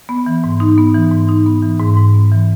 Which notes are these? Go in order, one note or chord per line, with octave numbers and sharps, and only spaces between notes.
B3
E3
G#2
D#4
B3
E3
G#2
D#4
B3
E3
G#2
G#2
B3
E3